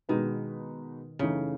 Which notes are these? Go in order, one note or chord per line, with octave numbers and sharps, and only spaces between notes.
B2 D#3 G#3 D#4 F#4 B4
F#2 C#3 E3 A3 D#4